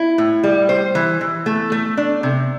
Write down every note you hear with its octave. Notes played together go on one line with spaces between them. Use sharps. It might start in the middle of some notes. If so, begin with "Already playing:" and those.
Already playing: E4
A2
G3
C5
E3
E3
A3
A3
D4
C3